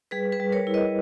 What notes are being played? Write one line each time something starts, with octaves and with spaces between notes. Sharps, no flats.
G3 G#4 B4
G#4 B4
G3
A#4 C#5
E4
B4 D#5